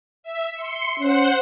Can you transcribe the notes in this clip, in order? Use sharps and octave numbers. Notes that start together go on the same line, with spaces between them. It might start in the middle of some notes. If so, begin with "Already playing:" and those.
E5
C6 C#7
C#4 C5 F#5